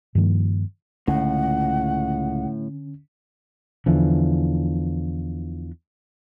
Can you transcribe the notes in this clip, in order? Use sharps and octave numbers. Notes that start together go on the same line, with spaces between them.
G2 D#3 F3 A#3
C#2 A2 D3 C#4 F#5
E2 D3 E3 F3